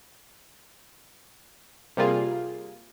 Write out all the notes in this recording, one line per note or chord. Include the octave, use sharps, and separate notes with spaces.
C3 G3 A#3 F4 G#4